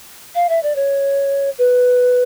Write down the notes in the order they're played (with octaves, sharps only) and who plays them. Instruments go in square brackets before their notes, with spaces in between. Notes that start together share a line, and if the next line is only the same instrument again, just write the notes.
[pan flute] F5
E5
D5
C#5
B4